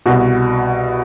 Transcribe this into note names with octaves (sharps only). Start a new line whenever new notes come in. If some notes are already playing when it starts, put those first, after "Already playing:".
C2 B2 F#4